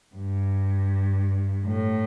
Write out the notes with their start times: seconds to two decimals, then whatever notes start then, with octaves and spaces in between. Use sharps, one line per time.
0.16 G2
1.65 A2